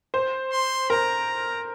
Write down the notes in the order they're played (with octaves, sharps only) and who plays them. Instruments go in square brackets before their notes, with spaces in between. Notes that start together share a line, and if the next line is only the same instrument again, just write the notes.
[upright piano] C5
[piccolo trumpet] C6
[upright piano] A#4 [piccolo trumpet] A#5